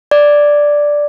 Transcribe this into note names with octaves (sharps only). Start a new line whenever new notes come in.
D5